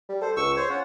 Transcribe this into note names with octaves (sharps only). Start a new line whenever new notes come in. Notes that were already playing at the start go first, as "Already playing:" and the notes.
G3
A4 C5
C#2 C#6 E6
C5 C#5
C#4 F4 F#5